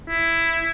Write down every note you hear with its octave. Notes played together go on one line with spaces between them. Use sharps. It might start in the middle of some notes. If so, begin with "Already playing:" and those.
E4